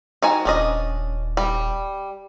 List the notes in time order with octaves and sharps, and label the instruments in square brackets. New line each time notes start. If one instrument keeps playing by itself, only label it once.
[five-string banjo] D#3 F#4 G#5
[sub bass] D#1 [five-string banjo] C#4 D4 D#5
[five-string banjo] G3